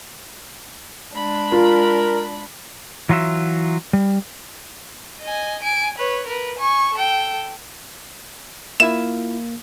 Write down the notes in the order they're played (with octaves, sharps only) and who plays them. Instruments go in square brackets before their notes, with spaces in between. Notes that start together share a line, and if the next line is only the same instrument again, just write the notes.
[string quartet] G#3 D4 B5
[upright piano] F4 [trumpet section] A#4
[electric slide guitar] E3 F#3 F4 F#4 E5
G3
[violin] D#5 G#5
G#5 D7
B4 C#5
A#4 B4
G#5 C#6
A4 G5
[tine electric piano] A#3 [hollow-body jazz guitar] E4 F4 E5 [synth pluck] E7